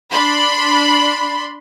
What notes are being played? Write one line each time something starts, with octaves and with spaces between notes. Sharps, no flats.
D4 B5 C6